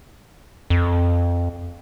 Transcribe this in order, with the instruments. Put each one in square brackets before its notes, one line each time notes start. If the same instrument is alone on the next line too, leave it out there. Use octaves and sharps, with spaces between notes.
[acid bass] F2